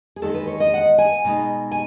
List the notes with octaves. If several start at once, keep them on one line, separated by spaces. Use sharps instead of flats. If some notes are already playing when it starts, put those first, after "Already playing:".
G#4
E2 D#3 G#3 D#4 A4
B4
C#5
D#5
F#5
G#5
B2 G#3 D#4
G#5